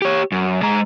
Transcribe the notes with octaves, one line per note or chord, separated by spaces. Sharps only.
G4 C#5
F#2
G#3 A#5